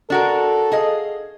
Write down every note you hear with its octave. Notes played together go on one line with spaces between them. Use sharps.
D4 F#4 A4 A#4
G#4 D#5 F5